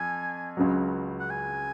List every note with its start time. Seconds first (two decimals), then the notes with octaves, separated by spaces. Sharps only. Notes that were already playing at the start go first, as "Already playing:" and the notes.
Already playing: F2 G#5
0.57 C#2 C#3 F#3
1.20 F#5
1.30 G#5